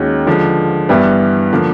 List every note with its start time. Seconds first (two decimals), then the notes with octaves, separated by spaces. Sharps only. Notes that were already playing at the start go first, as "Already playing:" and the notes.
Already playing: D#2 D#3 G#3 C#4 F#4
0.27 D3 F3 G#3
0.89 G2 E3 G3 B3 E4
1.53 D3 F3 A#3